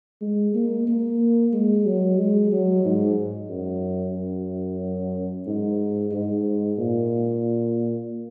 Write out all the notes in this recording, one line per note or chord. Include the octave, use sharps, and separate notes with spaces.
G#3
A#3
A#3
G#3
F#3
G#3
F#3
G#2
F#2
F#2
G#2
G#2
A#2